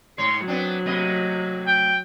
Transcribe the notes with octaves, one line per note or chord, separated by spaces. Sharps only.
G#2 C#5 C6
F#3 B3 C4 D4
C3 A3 D#5
G5